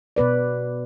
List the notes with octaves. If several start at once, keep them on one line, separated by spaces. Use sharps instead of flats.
B2 B3 B4 D5